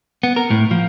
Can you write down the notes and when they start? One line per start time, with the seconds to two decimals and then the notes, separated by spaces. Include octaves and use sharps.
0.23 B3
0.36 A#4
0.51 A2
0.71 F3